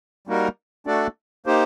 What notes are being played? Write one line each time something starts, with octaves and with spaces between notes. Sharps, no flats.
G3 A#3 D#4 F#4 A#4
A3 D4 F#4 A4 D5
A#3 D#4 G4 C5